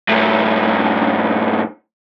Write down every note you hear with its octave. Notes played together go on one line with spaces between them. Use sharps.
F#2 A2